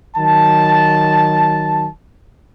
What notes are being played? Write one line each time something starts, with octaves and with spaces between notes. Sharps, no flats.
D#3 F#3 A5